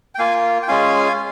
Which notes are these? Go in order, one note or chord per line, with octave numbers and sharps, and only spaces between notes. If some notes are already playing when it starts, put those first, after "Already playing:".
G5
A#3 F4 F5 G#5
G5
G#3 C#4 F4 F5 G#5